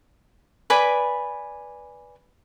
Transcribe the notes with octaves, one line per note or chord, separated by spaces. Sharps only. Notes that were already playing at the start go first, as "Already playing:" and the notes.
B4 D5 G#5 B5